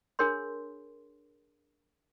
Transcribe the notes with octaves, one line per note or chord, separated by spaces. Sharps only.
D4 G#4 A#4 C#5 C6